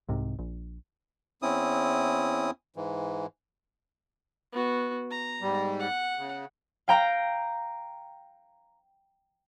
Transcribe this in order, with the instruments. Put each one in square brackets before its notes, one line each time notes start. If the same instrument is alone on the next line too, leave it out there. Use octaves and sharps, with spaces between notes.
[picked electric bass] C2 G#2 C3
A#1
[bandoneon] E2 C4 C#4 E4 D#6
G#2 E3
[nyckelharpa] B3 F#4
A#5
[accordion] G#2 G3
[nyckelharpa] F#5
[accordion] C#3
[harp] F5 G5 A#5